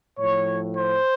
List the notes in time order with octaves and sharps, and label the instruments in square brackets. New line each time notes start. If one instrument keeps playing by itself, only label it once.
[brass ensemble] A2 F3 C#5
C5